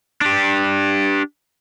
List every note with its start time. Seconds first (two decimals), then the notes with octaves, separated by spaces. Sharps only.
0.21 D4 G4